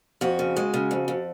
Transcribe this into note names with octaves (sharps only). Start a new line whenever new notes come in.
F2 F#4
C#3
G#3
C#3
F2
F2